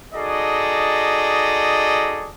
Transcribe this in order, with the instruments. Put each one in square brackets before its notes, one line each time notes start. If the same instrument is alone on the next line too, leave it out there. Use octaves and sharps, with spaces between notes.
[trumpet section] D#4 F#4 G#4 A4 D5 D#5